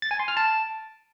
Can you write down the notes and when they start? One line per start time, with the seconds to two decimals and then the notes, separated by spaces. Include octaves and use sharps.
0.02 A6
0.11 G#5
0.19 C6
0.28 F6
0.37 A5